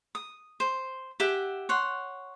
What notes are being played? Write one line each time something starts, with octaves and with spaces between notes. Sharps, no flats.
D#6
C5
G4 E5 F#5 G#5
C#5 F#5 C6